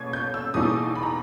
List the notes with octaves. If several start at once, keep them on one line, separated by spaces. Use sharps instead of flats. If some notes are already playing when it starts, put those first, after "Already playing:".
Already playing: B2 A#3 C#4 G#6
G6
E6
E2 B2 A#3 D#4 D#6
B5
A#5